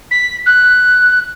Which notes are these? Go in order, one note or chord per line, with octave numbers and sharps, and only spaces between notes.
B6
F#6